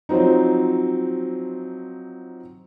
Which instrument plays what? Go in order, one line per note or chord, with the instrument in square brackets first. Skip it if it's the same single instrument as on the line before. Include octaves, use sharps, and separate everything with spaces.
[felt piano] F3 F#3 C4 D#4